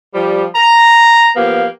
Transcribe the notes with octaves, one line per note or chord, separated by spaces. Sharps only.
F3 G3
A#5
F3 A#3 B3 G4 F5